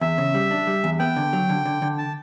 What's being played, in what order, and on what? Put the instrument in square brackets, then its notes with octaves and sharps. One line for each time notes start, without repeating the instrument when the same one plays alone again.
[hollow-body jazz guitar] E2 [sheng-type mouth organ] E5
[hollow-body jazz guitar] C#3
G3
D4
G3
E2
[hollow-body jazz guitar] B3 [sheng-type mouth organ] G5
[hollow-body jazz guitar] D3
F#3
D3
D3
D3
[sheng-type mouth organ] A5